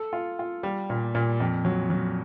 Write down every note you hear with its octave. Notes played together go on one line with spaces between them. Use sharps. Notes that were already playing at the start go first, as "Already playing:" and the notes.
Already playing: A4
F4
F4
G3
A#2
A#2
F2
F#3
F#3